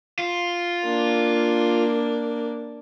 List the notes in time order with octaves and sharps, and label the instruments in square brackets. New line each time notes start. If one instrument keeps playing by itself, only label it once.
[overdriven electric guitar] F4
[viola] A#3 D4